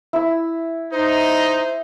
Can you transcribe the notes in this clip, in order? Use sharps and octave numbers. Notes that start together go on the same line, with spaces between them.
E4 E6
D#4 C5